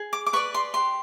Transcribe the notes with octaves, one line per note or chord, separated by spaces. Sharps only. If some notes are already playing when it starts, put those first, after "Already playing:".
Already playing: G#4
D6
D6
B4 D5 C#6
C6
G4 C6